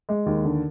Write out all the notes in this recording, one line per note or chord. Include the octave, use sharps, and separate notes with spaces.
G#3
D#2
D3